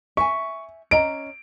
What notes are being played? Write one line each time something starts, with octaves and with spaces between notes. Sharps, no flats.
E5 G#5 C#6
C#4 D#5 A#5 D7